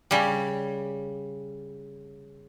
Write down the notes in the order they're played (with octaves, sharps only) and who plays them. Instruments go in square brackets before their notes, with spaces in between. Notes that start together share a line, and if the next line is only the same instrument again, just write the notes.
[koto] C#3 G3